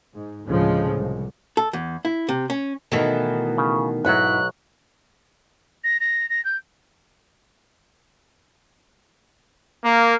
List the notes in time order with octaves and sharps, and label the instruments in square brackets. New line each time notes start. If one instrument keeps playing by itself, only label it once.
[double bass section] G#2
D2 A2 C#3 F3 G#3
C2
[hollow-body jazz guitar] A4
E2
E4
C3
C#4
[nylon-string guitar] B2 [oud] D#3 E3 A3 [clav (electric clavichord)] A4
[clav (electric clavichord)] C#3
[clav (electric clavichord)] B1 F#3 [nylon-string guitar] G#2 E4 F#5 [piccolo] F#6
[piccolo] A#6
A#6
A#6
G6
[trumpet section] A#3